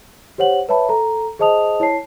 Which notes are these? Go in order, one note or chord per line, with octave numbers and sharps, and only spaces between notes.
G4 C5 C#5 F#5 F#7
B4 C#5 E5 A5 B5
A4 A#5
G#4 C5 D#5 A5 D#6 F7
E4 C#5 A5 C7